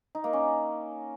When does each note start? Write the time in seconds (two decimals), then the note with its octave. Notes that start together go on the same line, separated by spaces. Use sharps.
0.15 D#4
0.24 A#3
0.33 C#4